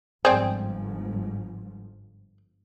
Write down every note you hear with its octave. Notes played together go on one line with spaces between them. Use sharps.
G1 G#2 F3 C4 G#4 C5 D5 G5